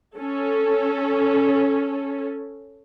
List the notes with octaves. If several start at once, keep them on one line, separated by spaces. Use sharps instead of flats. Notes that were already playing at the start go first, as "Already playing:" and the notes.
C#4 A4